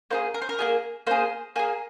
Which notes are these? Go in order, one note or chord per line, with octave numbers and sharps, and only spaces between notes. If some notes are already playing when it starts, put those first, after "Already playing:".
A#3 F4 G#4 C5
A#4
C5
A#4
A#3 F4 G#4
A#3 G#4 C5
A#3 G#4 G#5